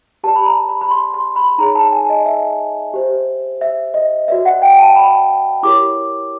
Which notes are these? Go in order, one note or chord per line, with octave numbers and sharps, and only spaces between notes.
G4 B4 D5 A5
B5
A#5
B5
B5
C6
C6
B5
D#4 G#4 C#5 A#5
A5
G#5
D#5
E5
G4 C5
E5
D#5
F#4 B4 D5 E5
F#5
G5
A5
B5
E4 G4 A#4 C#5 D6